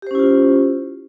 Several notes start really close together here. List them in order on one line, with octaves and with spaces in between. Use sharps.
G4 C5 C#4 E4 F4